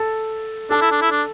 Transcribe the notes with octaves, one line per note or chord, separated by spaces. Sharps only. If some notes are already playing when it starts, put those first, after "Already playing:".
Already playing: A4 A5
D4 A4 A5
E4
D4
E4
D4